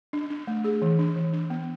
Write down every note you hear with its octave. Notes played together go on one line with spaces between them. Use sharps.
D4
D4
A3
G#4
E3
D4
E3
D4
B3